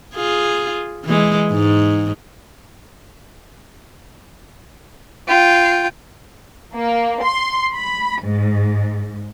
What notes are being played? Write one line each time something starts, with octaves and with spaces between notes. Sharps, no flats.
F4 G#4
E3 G#3
G#2
F4 G5
A#3
C6
B5
G#2